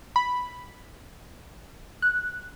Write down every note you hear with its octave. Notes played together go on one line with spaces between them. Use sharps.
B5
F#6